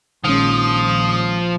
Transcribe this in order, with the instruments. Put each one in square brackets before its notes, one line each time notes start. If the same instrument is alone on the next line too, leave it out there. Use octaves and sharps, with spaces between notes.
[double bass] A#1 [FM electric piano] D#3 G#3 C#4 [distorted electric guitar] F3 [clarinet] D#6